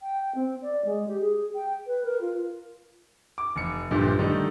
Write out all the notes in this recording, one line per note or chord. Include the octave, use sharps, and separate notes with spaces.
G5
C4
D5
G#3
G4
G#4
G5
B4
A#4
F4
D6
F1 C#7
A#1 G2 A#2 D3 F3 G3
D3 D#3 G3 A3 D#4 A4